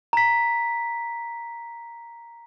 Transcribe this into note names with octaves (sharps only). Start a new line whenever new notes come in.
A#5 B6